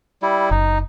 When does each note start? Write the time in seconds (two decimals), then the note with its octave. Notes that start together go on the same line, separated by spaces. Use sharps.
0.22 G3 E4
0.51 F#1 D#4